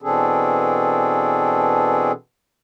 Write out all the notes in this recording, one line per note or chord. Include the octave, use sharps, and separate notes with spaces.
B2 E3 C4 D4 G#4 A4